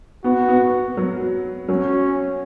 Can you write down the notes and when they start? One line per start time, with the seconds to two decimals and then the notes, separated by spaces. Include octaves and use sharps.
0.24 B3 F#4
0.48 B3
0.97 F#3
1.68 F#3 C#4